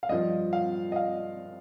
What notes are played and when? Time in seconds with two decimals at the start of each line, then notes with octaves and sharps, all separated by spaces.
0.03 F5
0.09 G2 F3 D#5
0.53 F5
0.92 D#5
0.96 F5